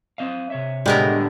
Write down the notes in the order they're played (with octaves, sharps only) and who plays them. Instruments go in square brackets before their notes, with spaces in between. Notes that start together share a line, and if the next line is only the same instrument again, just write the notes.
[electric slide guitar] C4 D#5 F5
C3 C#5 E5
[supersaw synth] A2 D3 [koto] G3 B3 A#4 [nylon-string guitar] G#3